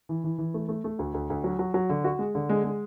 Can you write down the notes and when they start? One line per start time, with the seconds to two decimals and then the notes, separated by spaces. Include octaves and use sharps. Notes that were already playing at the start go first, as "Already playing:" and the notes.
0.09 E3
0.24 E3
0.38 E3
0.54 A3
0.69 A3
0.84 A3
0.99 D2
1.14 D2
1.30 D2
1.44 F#3
1.59 F#3
1.74 F#3
1.89 D3
2.04 F#4
2.19 G#3
2.35 D3
2.49 G#3
2.64 G#3